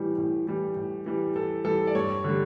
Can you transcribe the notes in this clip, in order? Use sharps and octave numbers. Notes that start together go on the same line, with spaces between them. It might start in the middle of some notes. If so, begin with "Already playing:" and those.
Already playing: A2 E3 G3
A2
E3 G3
A2
E3 G3
A2 A4
E3 G3 A4
D5
G2 C#5
D3 G3